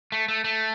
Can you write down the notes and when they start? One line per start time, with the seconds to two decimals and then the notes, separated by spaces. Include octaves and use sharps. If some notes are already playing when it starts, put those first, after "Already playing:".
0.12 A3
0.28 A3
0.44 A3